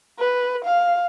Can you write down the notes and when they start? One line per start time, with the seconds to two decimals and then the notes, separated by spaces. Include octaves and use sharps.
0.19 B4
0.64 F5